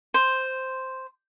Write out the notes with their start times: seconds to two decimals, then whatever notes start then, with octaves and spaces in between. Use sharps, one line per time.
0.14 C5